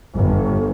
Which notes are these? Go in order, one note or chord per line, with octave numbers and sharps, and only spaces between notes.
G1